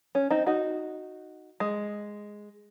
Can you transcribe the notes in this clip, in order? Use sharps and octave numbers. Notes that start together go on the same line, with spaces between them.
C#4
C4 D#4
D#4 F#4
G#3